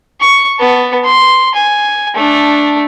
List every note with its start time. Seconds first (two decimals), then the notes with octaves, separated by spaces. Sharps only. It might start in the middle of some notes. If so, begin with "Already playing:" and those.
0.20 C#6
0.59 B3 A5
1.04 C6
1.55 G#5
2.15 A3 D4